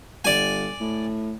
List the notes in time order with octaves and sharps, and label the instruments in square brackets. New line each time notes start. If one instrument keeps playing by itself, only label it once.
[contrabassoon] G1 [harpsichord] D5 G#5
[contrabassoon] A2